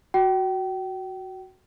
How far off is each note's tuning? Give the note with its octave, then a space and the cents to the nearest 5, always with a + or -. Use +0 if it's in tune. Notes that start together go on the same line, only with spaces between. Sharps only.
F#4 +0 G5 -35